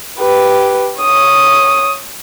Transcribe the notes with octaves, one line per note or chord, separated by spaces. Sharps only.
G4 B4
C#5 D#6